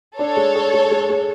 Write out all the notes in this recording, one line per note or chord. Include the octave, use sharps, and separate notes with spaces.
D4 A4 C#5
G#3
G#4
G#3
G#3
G#3